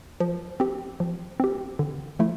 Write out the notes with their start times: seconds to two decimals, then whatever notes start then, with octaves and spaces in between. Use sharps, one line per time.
0.20 F3
0.60 C4 G4
1.00 F3
1.40 C4 G4
1.79 D3
2.19 F3 A3 E4